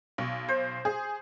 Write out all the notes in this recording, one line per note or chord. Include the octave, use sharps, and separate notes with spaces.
B1 C#6
C5
G#4